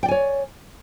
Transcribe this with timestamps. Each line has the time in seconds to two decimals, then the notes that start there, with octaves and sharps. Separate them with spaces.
0.03 G5
0.06 D5
0.08 G#5
0.11 C#5